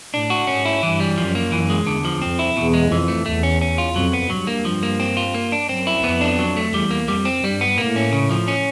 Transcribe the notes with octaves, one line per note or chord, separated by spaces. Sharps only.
A2 D4
F#4
G#2 C#4
E4
G2 E3
G3
F#2 F3
A#3
F#2 E3
G#3
E2 D3
F3
F2 C4
E4
E2 B2
G#3
F2 E3
A3
E2 A3
C#4
C#4
F4
F2 F#3
B3
G2 F#3
A#3
F3
A#3
C4
F4
A#3
D4
F#2 C4
E4
F2 B3
D4
F#3
A3
E2 G3
A#3
F2 G3
C4
G2 G3
B3
A2 A#3
C#4
C#3
F3
C#4